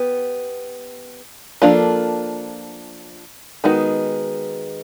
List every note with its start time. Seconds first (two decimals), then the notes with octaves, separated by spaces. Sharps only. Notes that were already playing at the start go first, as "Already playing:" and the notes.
Already playing: B3 G4
1.62 F3 A#3 D4 F4 A4
3.64 D#3 G#3 B3 D#4 F#4